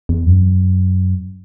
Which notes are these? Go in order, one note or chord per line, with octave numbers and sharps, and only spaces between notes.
E2
F#2